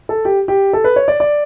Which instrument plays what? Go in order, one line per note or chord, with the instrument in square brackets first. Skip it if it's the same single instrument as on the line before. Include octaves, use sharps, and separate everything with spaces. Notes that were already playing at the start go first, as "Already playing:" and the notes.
[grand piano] A4
G4
G4
A4
B4
C#5
D5
D5